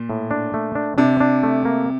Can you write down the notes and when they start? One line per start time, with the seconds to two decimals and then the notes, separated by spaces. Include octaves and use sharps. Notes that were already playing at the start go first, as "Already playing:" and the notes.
Already playing: A#2
0.10 A2
0.31 D4
0.54 A3
0.75 D4
0.98 C3 D4
1.20 D4
1.43 A3
1.65 A#3